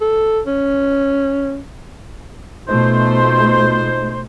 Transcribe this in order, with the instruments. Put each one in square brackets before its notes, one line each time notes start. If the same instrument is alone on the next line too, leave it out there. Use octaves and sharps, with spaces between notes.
[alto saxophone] A4
C#4
[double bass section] B2 A3 [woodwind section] D#4 F4 C5